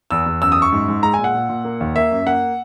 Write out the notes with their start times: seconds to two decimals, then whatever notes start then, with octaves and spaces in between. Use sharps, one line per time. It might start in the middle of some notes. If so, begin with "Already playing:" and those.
0.11 E2 E6
0.26 E2
0.42 F#2 E6
0.52 F#2 D#6
0.62 C#6
0.72 G#2
0.88 G#2
1.03 G#3 A#5
1.14 A#2 G#5
1.24 F#5
1.34 A#2
1.49 A#2
1.65 A#3
1.80 D#2
1.96 A#3 E5
2.11 F#2
2.26 A#3 F#5